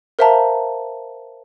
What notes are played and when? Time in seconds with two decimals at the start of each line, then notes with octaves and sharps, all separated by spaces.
0.19 A#4 C5 E5 F5 A5 A#5